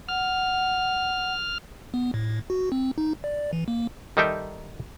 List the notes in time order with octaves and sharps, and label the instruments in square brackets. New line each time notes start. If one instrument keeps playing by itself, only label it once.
[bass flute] F#5 [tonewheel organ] F6
[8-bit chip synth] B3
A2
F#4
C4
D#4
D5
E3
A#3
[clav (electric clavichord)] D#3 G3 D#4 A4 E5 G5